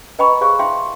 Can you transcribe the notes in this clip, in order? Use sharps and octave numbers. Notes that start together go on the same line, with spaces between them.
B4 D#5 G5 A#5 B5 C#6
G#4 C5 F5 C#6
E4 E5 F5 G5 C6